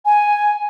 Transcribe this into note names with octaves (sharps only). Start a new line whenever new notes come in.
G#5